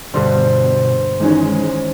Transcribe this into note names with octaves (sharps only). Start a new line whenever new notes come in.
G2 B2 D3 G3 C5
D#3 E3 G#3 C#4